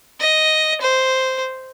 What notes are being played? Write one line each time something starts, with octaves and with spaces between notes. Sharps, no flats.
D#5
C5